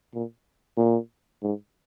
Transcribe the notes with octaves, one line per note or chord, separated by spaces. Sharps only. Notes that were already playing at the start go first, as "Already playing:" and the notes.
A#2
A#2
G#2